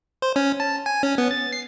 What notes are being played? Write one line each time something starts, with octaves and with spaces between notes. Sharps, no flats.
C5
C#4
A5
G#5
C#4
B3
A6
C7